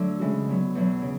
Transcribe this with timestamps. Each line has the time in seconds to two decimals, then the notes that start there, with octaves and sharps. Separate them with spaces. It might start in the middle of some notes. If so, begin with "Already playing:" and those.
Already playing: D3 F#3 A3 D4
0.19 C#3 E3 G#3 C#4 F#4
0.48 D3 F#3 B3
0.75 E2 B2 F#3
1.02 C#3